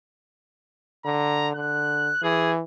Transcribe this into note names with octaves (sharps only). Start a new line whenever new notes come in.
D3 A#5
D3 F#6
E3 G#4